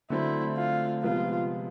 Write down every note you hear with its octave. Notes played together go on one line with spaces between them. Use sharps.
D3 F#3 A3 C4 E4
F4
C3 F3 G#3 B3 F4